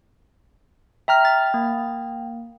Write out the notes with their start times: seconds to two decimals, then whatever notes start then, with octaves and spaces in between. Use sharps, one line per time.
1.08 E5 G5 A#5 F6
1.25 A6
1.54 A#3